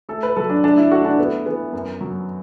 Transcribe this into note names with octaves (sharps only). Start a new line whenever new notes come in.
A3 A4
B4
F#3 A4
D4
A3 D4
E4
A3 F#4
D4
A3 B3
E3 B3
F#2
F#3